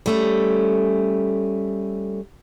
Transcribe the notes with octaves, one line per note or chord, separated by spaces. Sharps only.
G3 A3 C#4